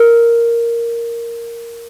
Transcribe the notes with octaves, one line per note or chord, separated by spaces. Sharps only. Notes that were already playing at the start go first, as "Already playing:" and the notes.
Already playing: A#4